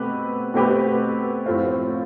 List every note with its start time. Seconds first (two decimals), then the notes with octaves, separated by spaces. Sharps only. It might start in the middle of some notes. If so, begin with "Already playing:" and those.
Already playing: B2 A3 C4 G4 B4
0.54 B2 A3 C4 G4 B4
1.46 A2 F3 A3 C4 F4